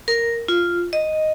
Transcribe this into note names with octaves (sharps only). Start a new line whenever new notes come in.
A#4
F4
D#5